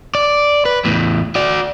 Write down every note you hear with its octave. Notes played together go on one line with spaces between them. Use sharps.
D5
B4
E2 A2
F#4 D5